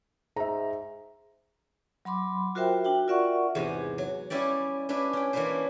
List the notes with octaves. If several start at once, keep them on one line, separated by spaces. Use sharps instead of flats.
G#2 E5 A#5
F#3 B5 C6 D6
F4 F#4 A#4 C5 E5 G5
D4 F#4 G5
F4 A#4 D5 E5 F#5 C#6
E2 G#2 C3 G#5
F#3
G3 C#4 E4 G4 D5
C#4 D4 E4 B4
C#4 G5
E3 A#3 C#4 D4 B4 C5